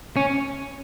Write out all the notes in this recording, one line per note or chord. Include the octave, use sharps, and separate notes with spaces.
C#4